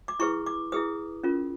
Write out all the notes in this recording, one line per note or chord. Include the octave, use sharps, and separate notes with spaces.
D6
E4 G#4 B4 C#6
D6
E4 G#4 B4 D#6
C#4 F4 A#4